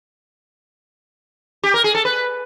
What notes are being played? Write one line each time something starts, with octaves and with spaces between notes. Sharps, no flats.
G4
A#4
G#4
A4
B4